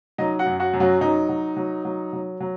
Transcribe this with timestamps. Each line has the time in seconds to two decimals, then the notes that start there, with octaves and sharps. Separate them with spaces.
0.18 F#3 D#4 D#5
0.39 F#4 F#5
0.46 F#2
0.60 F#4 F#5
0.73 F#2
0.80 F#3 F#4
1.01 F#3 D#4
1.29 F#3
1.57 F#3
1.85 F#3
2.13 F#3
2.40 F#3